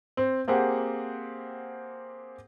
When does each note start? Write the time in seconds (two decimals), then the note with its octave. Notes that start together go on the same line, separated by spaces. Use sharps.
0.17 C4
0.48 A#3 C4 G4 G#4 F#5